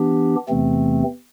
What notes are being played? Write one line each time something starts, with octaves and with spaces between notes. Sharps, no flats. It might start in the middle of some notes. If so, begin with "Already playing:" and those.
Already playing: E3 B3 D4 G4
E2 C3 E3 A3 C4